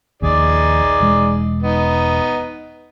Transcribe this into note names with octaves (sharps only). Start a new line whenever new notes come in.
A#1 D#2 D#4 G#4 D5
E1 G#3
B3 D#4